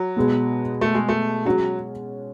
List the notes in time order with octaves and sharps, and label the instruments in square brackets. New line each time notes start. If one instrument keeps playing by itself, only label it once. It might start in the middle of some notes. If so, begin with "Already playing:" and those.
Already playing: [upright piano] F#3
[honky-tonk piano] B2 G#3 B3
[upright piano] A3
G#3
A3
[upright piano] F#3 [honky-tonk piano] G#3 C#4 F#4